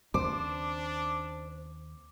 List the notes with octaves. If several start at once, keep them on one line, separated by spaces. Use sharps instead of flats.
D#2 C#3 C4 D4 C5 D6